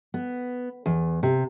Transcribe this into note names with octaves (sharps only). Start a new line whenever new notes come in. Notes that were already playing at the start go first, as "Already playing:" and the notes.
B3
E2
C3